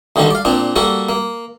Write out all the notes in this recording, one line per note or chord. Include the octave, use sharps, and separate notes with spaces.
D2 D3 D#3 G3 D4
D5 F5
A#2 C4 D4
G3 A#3 F#4 A4
A#3